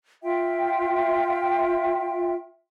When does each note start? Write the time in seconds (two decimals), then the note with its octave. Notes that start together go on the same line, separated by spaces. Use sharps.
0.23 F4 E5 G5